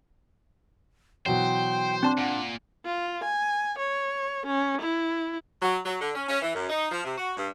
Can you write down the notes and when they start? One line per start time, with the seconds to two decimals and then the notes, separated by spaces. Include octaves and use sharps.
1.26 B2 E3 F#3 C5 G5
2.03 C4 D4 A5 C6
2.18 A#2 F#5
2.85 F4
3.24 G#5
3.79 C#5
4.46 C#4
4.82 E4
5.62 F#3
5.86 F#3
6.00 D3
6.15 C#4
6.29 C#4
6.42 E3
6.55 F#2
6.69 D#4
6.91 F3
7.04 C3
7.17 F#4
7.37 G2